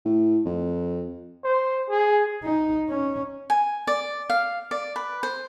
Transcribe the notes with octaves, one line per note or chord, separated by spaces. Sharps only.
A2
F2
C5
G#4
D#4
C#4
G#5
D5
F5
D5
B4
C5